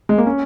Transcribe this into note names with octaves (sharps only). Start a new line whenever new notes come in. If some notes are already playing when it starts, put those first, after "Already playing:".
G#3
A#3
C#4